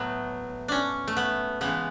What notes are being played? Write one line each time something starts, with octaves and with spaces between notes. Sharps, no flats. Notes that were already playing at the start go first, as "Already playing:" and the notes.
Already playing: A2 F#3 A3 B3
C#4 D4
A3
B3
C#3 E3 G#3 B3